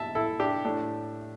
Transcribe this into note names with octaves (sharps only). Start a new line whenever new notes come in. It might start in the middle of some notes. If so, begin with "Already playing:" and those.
Already playing: E5 A5
E4 A4
D4 G4
A2 A3 D4